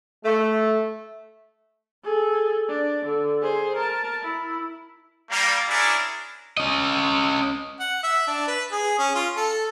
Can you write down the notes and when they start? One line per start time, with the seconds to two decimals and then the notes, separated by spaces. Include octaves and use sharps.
0.25 A3
2.03 G#4 A4
2.68 D4
3.06 D3
3.41 G#4 C5
3.76 A#4 A5
4.22 E4
5.31 G3 A#3
5.69 C#4 D4 E4 G#4 A#4 D5
6.57 C#4 D#5
7.80 F#5
8.03 E5
8.28 D4
8.48 B4
8.72 G#4
8.99 C#4
9.15 F4
9.37 A4